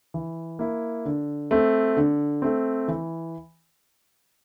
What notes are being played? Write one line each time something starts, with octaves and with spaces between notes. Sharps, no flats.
E3
A#3 E4
D3
A3 C4
D3
A3 C4
E3